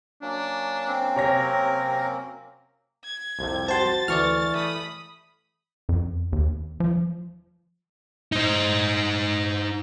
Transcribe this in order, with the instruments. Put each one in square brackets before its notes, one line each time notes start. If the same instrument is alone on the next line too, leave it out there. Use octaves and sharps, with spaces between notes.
[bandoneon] F#3 A#3 C#4 [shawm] D4
[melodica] C4
[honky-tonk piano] C3 C#5 A#6 [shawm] A#4
[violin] G#6
[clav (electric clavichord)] C2 F2 C3
[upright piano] F#4 C5 [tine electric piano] A5 C6 [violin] A6
[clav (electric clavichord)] D2 [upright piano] E3 [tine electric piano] D5 C#6 F6
[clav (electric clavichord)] A3 [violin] B5 D#6
[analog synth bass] F2
D#2
F3
[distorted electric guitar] D#4 C5